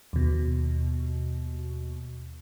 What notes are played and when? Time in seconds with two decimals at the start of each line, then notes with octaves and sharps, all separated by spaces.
0.13 D#2 B2